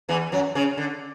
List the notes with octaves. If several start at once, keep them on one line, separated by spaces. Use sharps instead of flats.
E2 E3
F#2 F#3
C#3 C#4
D3